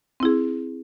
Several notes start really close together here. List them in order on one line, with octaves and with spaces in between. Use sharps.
C4 E4 G#4